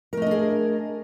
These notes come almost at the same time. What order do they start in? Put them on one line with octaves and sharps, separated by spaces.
A#4 A3 D#5 D4 G#4